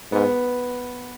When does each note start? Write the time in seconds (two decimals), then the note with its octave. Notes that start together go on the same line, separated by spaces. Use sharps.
0.11 G#2 B3